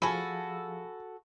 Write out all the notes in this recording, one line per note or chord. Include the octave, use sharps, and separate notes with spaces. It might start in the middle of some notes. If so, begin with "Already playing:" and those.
F3 F#4 G#4 A4 F5 G#5 B5